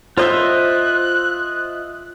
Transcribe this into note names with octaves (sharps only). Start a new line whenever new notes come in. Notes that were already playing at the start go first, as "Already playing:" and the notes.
F4 C5 D#5 E5 F#6 G6